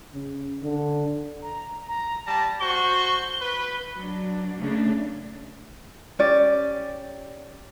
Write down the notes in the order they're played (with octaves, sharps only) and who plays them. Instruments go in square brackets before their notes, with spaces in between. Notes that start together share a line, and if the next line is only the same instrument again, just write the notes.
[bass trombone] C#3
D3
[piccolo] A#5
A#5
[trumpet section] G3 A5 [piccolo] A#6
[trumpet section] F#4 C5 C#6 [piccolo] G7
[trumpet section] B4
[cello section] F#3 D4
C#3 A3 A#3 C#4 D4
[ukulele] C#4 G4 D5